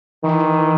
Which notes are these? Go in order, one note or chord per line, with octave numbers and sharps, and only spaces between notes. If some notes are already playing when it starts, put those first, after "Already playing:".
D#3 E3